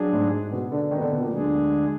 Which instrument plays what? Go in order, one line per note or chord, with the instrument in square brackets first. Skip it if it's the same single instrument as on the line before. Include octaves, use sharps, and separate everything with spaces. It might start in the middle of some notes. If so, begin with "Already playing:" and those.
Already playing: [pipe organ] F#3 D4 G#4
[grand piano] G#2 G#3
B2 B3
D3 D4
D#3 D#4
B3
D3 D4
B2 B3
A#2 A#3
[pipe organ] D2 D3 G#3 D4 G#4 [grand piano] F#3